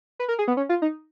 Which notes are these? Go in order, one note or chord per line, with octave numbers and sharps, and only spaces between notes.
B4
A#4
G#4
B3
C#4
F4
D#4